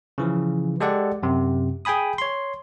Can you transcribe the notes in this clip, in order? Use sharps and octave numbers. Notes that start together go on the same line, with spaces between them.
C#3 E3 F3
G#3 G4 A4 D5 F#5
F#2 C3
G#4 G5 G#5 B5 D#6
C#5 C6